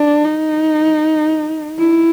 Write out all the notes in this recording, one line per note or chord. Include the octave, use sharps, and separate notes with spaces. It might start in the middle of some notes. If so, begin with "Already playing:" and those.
Already playing: D4
D#4
E4